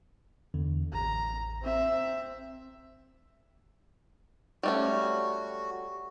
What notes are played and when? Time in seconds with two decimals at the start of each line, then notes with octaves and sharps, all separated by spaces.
0.54 E2 D3
0.93 A1 A#5
1.62 C4 E5
4.63 G3 A3 C#4 F#4